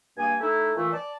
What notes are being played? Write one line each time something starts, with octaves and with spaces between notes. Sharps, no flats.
G2 A#3 G#5
A3 D#4 E4
A#2 E3 A3
D5 A5